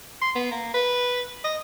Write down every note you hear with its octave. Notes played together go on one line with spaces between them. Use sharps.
C6
B3
A#3
B4
D#5